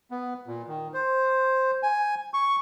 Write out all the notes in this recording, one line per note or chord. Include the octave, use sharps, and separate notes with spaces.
B3
A#2
D#3
C5
G#5
C#6